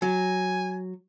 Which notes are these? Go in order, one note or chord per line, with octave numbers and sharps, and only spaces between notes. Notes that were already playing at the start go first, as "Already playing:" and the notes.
F#3 G#5